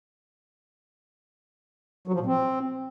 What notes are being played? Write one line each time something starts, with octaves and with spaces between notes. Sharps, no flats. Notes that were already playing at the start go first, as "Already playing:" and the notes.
F#3
F3
A#2
C4